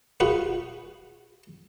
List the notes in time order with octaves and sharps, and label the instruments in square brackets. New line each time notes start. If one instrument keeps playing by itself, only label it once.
[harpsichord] F4 F#4 G#4 B4